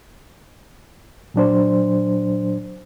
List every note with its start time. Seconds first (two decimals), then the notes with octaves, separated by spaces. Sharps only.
1.34 A#2 F#3 D4 C5